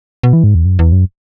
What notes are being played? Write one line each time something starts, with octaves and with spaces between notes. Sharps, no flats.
B2
E3
G#2
E2
F#2
E2
F#2